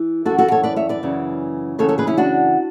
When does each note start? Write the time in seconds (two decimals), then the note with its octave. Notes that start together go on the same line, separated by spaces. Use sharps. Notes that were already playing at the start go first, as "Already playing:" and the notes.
Already playing: E3
0.25 F#2 F#4 A4
0.30 E3
0.38 F#4 A4
0.51 A4 C#5
0.63 B4 D5
0.76 C#5 E5
0.89 B4 D5
1.03 F#2 C#3 E3
1.79 F#2 C#3 E3 A4 C#5
1.89 A4 C#5
1.98 G#4 B4
2.07 C#4 E4
2.17 D4 F#4